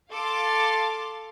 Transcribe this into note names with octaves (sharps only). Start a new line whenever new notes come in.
A4 F5 A5 C6 D6